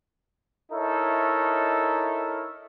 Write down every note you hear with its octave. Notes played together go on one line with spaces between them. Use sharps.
D#4 E4 A4 A#4 C#5 E5